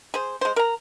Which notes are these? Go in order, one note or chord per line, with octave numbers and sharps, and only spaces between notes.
G#4 C5
G#3 C5
A#4 A#5